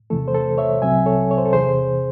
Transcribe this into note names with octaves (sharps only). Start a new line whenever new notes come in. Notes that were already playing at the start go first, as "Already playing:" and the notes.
E2 C3 E3 A3 A4
C5
A4
C#5 E5
C2 C3 F#3 C4 E5 G#5
A4 C#5
C#5
C5
A4
E2 C3 E3 G#4 C5